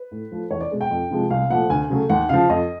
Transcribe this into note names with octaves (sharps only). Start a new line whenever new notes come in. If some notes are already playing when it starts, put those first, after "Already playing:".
Already playing: B4
A2
F3 A3
E2 C#5
D5
B2 G#3
G5
F2
C3 F3 G#3
C2 F5
A#2 F3 A3 F#5
D2 G#5
C#3 F#3 A3
D#2 F#5
C#3 F3 F5
F2 D#5